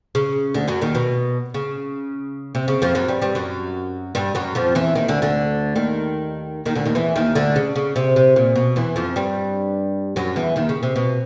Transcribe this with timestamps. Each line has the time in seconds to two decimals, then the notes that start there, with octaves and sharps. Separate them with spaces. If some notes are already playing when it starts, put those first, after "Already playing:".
0.15 C#3
0.54 D2 D3
0.68 F#2 F#3
0.81 D#2 D#3
0.95 B2
1.54 C#3
2.55 C3
2.68 C#3
2.82 F2 F3
2.95 F#2 F#3
3.08 G2 G3
3.22 G2 G3
3.35 F#2 F#3
4.15 G2 G3
4.35 F#2 F#3
4.55 F2 F3
4.75 E2 E3
4.95 D#2 D#3
5.08 D2 D3
5.22 D2 D3
5.75 D#2 D#3
6.65 D#2 D#3
6.75 D2 D3
6.86 D#2 D#3
6.95 E2 E3
7.16 D#2 D#3
7.35 D2 D3
7.56 C#3
7.76 C#3
7.96 C3
8.16 C3
8.36 A#2
8.56 B2
8.76 E2 E3
8.96 F2 F3
9.16 G2 G3
10.16 F#2 F#3
10.36 E2 E3
10.56 D#2 D#3
10.69 C#3
10.83 C3
10.96 B2